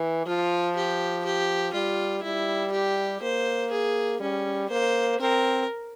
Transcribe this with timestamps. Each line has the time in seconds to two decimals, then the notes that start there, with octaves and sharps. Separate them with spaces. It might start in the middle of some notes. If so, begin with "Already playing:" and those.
Already playing: E3
0.26 F3 F4
0.76 G4
1.25 G4
1.74 G3 F4
2.23 G3 E4
2.72 G4
3.22 A#3 C5
3.71 G#4
4.20 G3 C#4
4.69 A#3 C5
5.20 C4 A#4